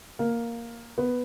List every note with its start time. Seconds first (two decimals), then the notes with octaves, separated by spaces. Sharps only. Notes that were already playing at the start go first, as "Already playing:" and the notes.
0.19 A#3
0.98 B3